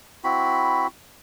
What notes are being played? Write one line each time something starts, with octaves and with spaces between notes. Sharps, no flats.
C4 E4 F#4 B5